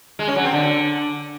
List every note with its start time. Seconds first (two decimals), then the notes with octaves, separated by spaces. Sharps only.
0.19 G#3
0.27 C#4
0.36 F#3
0.44 C4
0.53 D3